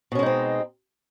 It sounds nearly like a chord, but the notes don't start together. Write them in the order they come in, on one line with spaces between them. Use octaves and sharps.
B2 C#4 G#3 D#4 C4